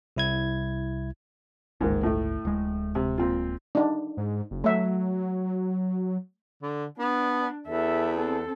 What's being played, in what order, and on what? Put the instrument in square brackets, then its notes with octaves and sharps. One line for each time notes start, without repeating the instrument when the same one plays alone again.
[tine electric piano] C2 E4 G#6
[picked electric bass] G1 C#2 [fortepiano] G#2 D#3 A#3
[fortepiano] A2 A3
[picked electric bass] D1 G#3
[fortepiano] C3
A#2 C4 F4
[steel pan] D4 D#4
[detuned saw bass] G#2
F#1
[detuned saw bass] F#3 [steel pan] A3 E5
[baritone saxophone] D3
[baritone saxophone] B3 [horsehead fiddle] D4
[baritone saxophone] E2 [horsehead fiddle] A4 E5
[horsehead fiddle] C4 A4